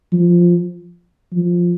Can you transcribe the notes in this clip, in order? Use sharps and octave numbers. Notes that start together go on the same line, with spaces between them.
F3
F3